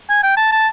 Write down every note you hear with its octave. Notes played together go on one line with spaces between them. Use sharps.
G#5
G5
A5
A5